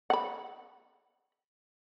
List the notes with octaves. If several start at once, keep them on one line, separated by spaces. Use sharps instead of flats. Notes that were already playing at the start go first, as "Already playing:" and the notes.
F#5 B5